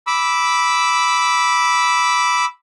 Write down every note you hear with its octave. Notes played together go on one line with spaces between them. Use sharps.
B5 D6 E6